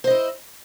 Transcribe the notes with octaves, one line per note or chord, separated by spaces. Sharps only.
E4 C5 D#5